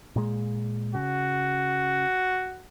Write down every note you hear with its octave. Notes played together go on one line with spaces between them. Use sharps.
A#2 G#3
C#3 F#4